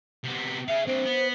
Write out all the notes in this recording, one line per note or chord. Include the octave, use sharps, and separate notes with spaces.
C3 B3
G#4 E5 F5
C4 D4 C5
B3